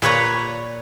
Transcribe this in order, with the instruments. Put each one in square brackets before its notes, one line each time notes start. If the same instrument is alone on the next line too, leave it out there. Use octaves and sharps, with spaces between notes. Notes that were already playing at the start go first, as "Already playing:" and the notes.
[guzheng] A#2 B4 C#5 A#5